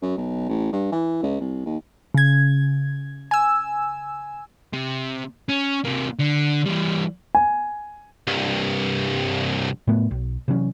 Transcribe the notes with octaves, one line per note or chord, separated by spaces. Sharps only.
F#2
B1
A1
G2
E3
C#2
C2
D#2
C#3 G#6
G#5 E6
C3
C#4
C3 A#3
D3
E3 G3
G#5
C2 G2
A2 F#3 A3 B3
B1
C3 E3 F#3 C#4